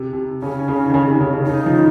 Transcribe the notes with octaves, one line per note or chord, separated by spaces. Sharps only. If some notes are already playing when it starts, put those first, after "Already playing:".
Already playing: C3
C3
C#3 C#4
C#3
D#3
C#3
C3
D#3
C#3
C#3
C#3 D#4
F3
D#3